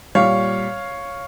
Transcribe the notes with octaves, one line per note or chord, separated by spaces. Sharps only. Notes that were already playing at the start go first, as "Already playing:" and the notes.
A#2 G3 C#5 F5